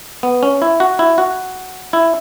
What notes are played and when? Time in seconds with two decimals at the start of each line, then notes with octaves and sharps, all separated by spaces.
0.23 B3
0.43 C#4
0.62 E4
0.80 F#4
0.99 E4
1.18 F#4
1.93 E4